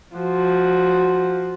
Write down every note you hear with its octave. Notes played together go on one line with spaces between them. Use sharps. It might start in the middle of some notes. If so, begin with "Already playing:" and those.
F3 F#4